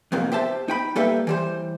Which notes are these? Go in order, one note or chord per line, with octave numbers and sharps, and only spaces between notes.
F2 G#2 C3 A#3
G4 C5 E5 A5
D#4 G5 B5
G3 A#3 A4 B4 E5 G5
E3 G3 C5